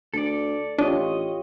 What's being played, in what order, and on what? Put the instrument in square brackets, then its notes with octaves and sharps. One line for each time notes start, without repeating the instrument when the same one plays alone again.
[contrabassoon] D2 [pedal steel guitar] A4 D5
[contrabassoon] A1 [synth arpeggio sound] D4 [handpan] F4 G4 C#5 [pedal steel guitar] D#5